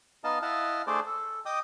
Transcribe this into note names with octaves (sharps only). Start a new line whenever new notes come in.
B3 D#4 D#5 F5 A5
E4 D#5 F5 F#5 A5
A3 D4 G#4 C5 D5
A4
D#5 G5 D6 D#6